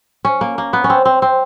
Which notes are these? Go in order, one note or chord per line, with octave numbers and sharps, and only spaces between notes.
C#4
A#3
A#3
B3
C#4
C4
C4
C4